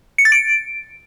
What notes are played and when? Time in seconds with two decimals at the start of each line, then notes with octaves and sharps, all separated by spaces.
0.18 C#7
0.25 A6
0.32 D7